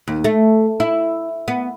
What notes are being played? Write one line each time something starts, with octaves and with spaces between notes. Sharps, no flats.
D#2
A3
E4
B3